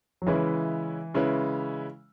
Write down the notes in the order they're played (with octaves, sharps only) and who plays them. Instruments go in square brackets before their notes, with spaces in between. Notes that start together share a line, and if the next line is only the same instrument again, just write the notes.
[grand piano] F#3
[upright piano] C#3 G#3 C#4 E4 B4 [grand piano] E3
[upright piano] C#3 G#3 C#4 E4 B4